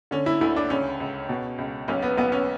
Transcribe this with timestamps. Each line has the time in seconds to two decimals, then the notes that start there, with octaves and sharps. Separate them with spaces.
0.11 D3 C#4
0.26 E4
0.41 D2 E4
0.56 D4
0.70 C#2 C#4
1.00 C#2
1.29 B2
1.58 C#2
1.88 B1 C#4
2.02 B3
2.18 B1 B3
2.32 C#4